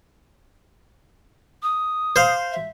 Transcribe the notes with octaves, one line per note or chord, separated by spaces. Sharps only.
D#6
C5 F5
E5